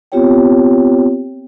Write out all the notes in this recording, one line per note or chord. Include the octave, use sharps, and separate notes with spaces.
B3 C4 F4 G4 C#5 G5